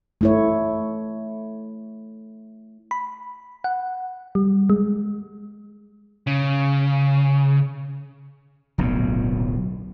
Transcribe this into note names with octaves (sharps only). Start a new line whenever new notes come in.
A3 E4 C#5
B5
F#5
G3
G#3
C#3
D1 B1 F#2 A#2